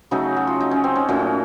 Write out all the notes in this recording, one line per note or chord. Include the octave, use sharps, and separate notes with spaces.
C#3 F#3 A3 D#4
F#4
F4
D#4
C#4
C4
C#4
A#2 F#3 A3 C#4